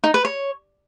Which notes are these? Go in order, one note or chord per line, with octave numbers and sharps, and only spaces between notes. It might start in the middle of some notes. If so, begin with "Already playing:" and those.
D#4
B4
C#5